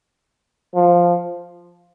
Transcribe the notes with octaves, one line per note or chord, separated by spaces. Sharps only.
F3